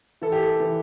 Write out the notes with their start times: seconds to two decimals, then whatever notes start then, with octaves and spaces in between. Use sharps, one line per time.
0.22 E3 A4
0.32 G4
0.43 A4
0.60 E3